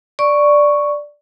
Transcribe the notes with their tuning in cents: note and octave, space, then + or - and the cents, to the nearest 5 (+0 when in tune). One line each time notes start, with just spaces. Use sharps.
D5 +0 C#6 +0